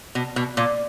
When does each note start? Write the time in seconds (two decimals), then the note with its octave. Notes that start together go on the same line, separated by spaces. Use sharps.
0.15 B2
0.36 B2
0.57 A#2